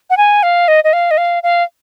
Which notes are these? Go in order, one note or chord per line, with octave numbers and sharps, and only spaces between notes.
F#5
G#5
F5
D#5
D#5
F5
D#5
F5
F5